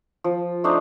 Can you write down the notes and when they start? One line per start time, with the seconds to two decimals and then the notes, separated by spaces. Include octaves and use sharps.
0.24 F3
0.64 A3 D4 D#4 C5